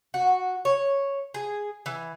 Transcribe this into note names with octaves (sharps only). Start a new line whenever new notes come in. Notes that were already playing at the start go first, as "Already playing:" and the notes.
F#4
C#5
G#4
E3